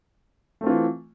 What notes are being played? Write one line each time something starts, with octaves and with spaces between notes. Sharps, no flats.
E3 A3 C4 F4